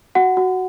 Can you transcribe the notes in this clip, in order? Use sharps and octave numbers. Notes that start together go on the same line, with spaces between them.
F#4 F#5
F#4